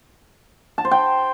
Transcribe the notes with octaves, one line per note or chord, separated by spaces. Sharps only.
A5
C5
G5